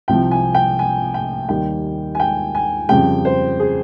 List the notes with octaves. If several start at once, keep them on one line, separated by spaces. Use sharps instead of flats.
C2 C3 F3 G5
G#5
G5
G#5
G5
D#2 D#3 G3 G5
G#5
G5
G#5
F2 C#3 G3 G5
C5
G#4